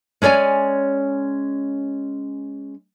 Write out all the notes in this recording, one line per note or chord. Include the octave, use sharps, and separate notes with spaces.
G#3 C#4 C#5 D5 G#5